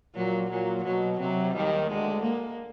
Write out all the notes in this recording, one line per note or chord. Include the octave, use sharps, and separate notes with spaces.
A#2 F#3
A#2 F#3
B2 F#3
C3 F#3
D#2 D#3 G3
D2 D3 G#3
A#3